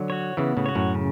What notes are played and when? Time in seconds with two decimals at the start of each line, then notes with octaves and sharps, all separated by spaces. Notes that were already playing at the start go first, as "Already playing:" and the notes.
Already playing: D3 F#3
0.10 F#4 C#5
0.37 C#3 E3 B3
0.57 A2 C#3
0.66 F#4 C#5
0.75 F#2 A2
0.94 C#3